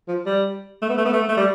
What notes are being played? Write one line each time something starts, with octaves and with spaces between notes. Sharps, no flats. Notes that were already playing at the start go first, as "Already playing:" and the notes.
F3
G3
A3
B3
A3
B3
A3
A3
G3